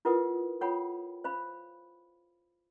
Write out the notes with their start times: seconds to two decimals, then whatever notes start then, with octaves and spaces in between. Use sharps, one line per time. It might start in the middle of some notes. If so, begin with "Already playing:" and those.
0.05 E4 F4 A#4 B4 F#5 D#6
0.61 F4 A4 C#5 F#5 G5 B5
1.24 C5 F5 B5